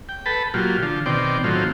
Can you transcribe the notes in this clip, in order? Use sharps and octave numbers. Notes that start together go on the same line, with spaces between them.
G5
A4 B4 A5 B5
A#2 F#3 F4 G4
D3 F3
B2 D#3 C4 D5 G5
A2 D#3 F#3 C4 F4